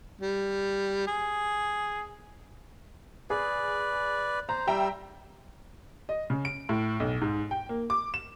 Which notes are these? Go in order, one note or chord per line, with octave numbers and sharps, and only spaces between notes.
G3
G#4
G#4 B4 D5
C5 A#5
G3 E5 G5 A#5 E6
D#5
C#3
D7
A2
B1
G#2
G5
A#3
D6
E7